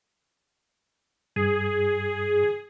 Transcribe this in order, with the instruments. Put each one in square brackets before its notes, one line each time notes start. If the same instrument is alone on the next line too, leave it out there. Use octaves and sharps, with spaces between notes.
[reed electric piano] G2 [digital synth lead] G#4